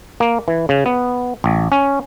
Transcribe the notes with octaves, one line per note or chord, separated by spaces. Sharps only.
A#3
E3
C#3
B3
A1
C#4